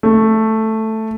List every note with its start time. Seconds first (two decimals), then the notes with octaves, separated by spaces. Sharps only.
0.03 A3